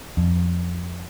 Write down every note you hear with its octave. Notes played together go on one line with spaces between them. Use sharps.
F2